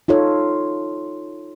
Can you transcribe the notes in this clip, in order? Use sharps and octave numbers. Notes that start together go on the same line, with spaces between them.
D#4 F4 A4 C#5